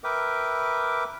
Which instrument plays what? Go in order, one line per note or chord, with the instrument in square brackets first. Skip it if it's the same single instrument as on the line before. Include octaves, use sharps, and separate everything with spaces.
[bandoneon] A#4 B4 E5 G5 D6